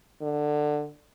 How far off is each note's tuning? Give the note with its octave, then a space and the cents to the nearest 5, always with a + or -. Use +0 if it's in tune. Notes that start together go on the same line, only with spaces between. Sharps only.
D3 +15